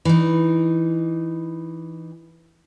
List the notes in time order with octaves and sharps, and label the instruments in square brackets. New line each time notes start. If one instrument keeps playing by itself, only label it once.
[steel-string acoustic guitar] E3 D#4